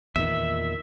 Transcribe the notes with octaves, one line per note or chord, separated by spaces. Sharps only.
E2 A#2 D#3 E5